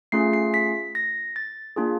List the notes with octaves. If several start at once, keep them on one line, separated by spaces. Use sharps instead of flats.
A3 C#4 F4 G#4 C7
C7
B6
A#6
A6
A#3 D4 F4 G#4